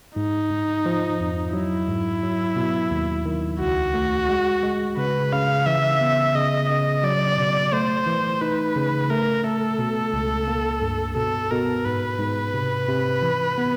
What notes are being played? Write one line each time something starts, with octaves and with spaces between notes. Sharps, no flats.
G#2 D#4
G#2
F3
F2
F#3 E4
G#2
F#3
B2
D#2
D#3
C#2 F#4
A3
G#3
G#3
C#3 B4
C#3 F5
E3 E5
B3
C#3 D#5
C#3 D#5
F#3 D5
B2
A3 C5
E3
D#4 B4
C#3
A3 A#4
A3 A4
B2
C#2
A#3
G2
B2 A4
B2 A#4
G#2 B4
G#2
C3
C3
E3
B3